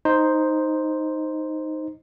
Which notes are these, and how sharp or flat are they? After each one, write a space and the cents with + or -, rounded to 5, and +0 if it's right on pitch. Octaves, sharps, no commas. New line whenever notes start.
D#4 +0 C5 +0